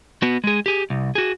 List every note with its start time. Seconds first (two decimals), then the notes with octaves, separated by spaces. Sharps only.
0.22 B3 F#4
0.44 G#3 G#4
0.66 G4 G#4
0.90 C2
1.15 F#4 G#4